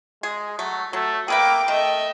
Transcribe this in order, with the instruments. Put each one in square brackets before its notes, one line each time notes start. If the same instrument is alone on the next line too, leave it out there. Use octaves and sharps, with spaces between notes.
[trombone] G#3 [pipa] G#4
[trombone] F#3 [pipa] A3
[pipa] F#3 [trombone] A3
[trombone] A#3 [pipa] G#4 B4 E5 [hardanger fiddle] G5 [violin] A#5 D6
[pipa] D#3 [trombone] A3 [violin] D#5 E5